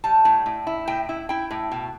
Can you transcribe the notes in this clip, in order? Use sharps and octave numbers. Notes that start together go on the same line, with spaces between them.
G3 A5
A2
A2
E4
A2 G5
E4
E4 G5
A2
B2